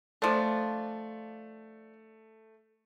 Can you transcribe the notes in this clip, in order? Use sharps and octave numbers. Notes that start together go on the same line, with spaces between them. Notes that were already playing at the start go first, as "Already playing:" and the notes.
F3 A3 D4